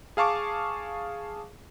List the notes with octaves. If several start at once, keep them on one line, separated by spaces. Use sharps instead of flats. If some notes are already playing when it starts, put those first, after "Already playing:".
G#4 F5 A5 C#6 D6